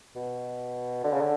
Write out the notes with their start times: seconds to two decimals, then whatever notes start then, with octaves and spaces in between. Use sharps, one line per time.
0.16 B2
1.04 D3
1.13 C#3
1.21 D3